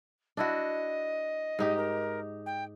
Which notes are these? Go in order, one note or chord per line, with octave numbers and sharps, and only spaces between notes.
D4 E4 F#4 D#5
G#2 D#4 G4
A#4
G5